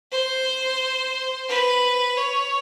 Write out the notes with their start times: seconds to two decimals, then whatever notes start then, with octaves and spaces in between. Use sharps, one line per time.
0.12 C5
1.48 B4
2.17 C#5